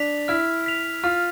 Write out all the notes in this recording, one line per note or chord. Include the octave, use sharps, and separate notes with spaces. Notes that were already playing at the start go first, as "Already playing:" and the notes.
Already playing: D4 B6 F7
E4 F6
B6 F7
F4 F6